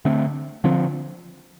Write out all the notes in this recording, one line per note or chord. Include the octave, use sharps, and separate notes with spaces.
D3 A3 C4
D3 F3 C4